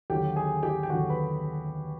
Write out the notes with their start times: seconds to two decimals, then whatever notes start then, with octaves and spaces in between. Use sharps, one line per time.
0.10 D#2 D3 F#3 G4 G5
0.36 G#4 G#5
0.63 G4 G5
0.83 G5
0.90 D#2 D3 F#3 F#4 F#5
1.10 B4 B5